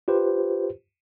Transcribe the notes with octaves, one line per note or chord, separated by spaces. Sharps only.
F4 G4 B4 C5